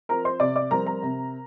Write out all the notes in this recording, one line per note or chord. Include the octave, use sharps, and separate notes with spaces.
F3 C4 A#4 A#5
C5 C6
C3 D5 D6
D5 D6
G3 C4 A#4 A#5
A#4 A#5
C3